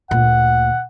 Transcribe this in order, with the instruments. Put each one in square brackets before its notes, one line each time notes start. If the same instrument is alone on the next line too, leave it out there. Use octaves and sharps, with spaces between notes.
[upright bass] D2 A#2 [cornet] F#5